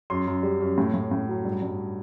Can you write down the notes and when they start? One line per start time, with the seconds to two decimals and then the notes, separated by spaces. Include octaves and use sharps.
0.10 F#2 C6
0.27 F#2
0.43 G3
0.61 F#2
0.78 A2
0.94 A2
1.11 A2
1.29 F#3
1.44 G2
1.62 G2